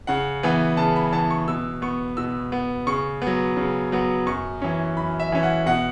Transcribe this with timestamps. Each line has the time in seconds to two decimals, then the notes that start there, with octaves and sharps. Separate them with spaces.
0.07 C#3 F#5
0.43 E3 B3
0.77 C#3 A5
0.96 B5
1.12 E3 B3 A5
1.31 C#6
1.48 B2 E6
1.82 B3 C#6
2.17 B2 E6
2.52 B3
2.87 C#3 C#6
3.22 F#3 B3
3.57 C#3
3.92 F#3 B3
4.27 F#2 C#6
4.62 E3 C#4
4.97 F#2 B5
5.20 E5
5.32 E3 C#4
5.43 F#5
5.66 B2 F#5